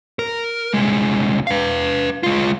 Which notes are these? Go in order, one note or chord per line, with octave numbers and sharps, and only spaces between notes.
A#4
C2 G#3
B4 F5
G#3 F4